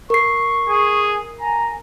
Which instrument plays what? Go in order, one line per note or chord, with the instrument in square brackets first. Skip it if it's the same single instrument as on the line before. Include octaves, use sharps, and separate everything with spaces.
[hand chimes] A#4 C7 [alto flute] C#6
[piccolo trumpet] G#4
[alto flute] G#5 [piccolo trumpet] A#5